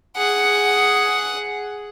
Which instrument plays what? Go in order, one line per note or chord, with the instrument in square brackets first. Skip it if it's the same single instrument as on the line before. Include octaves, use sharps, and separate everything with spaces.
[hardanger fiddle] G#4 F#5